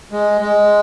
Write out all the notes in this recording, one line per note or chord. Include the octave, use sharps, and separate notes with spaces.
G#3
G#3